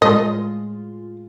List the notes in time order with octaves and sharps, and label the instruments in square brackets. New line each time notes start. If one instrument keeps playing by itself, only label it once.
[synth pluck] A2 G#3 F4 [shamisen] D#5